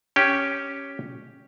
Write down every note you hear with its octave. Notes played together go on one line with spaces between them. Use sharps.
C#4 G4